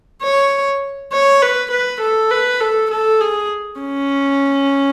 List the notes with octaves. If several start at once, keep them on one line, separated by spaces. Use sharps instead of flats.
C#5
C#5
B4
B4
A4
B4
A4
A4
G#4
C#4